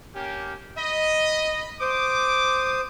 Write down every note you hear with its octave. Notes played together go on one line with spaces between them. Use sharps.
A#3 C#4 G4
D#5 B5
C5 D6 D#6